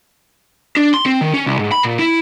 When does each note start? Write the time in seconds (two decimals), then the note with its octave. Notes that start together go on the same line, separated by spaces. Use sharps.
0.77 D4
0.94 C6
1.06 C4
1.21 D#3
1.34 C#4
1.46 C2
1.59 G#2
1.72 B5
1.83 A#2
1.99 E4